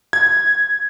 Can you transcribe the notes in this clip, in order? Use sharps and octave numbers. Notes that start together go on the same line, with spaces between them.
G#6